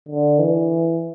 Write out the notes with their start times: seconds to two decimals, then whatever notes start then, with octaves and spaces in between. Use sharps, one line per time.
0.09 D3
0.39 E3